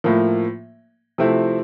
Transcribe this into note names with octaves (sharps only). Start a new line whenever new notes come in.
A2 F3 A#3
C3 F3 A3 C4 E4